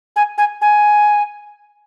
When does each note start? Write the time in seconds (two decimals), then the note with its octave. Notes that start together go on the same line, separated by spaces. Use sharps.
0.16 G#5
0.38 G#5
0.61 G#5